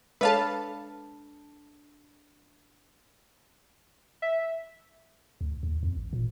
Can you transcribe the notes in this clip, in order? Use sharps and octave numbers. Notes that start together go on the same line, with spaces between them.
G#3 D4 A4 B4 C#5 F5 A5
E5
D2
D#2
F2
A1
A#2